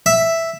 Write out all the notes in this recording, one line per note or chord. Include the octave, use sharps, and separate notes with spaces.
E5